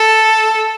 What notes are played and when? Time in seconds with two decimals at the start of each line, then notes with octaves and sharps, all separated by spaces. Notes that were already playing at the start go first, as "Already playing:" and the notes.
Already playing: A4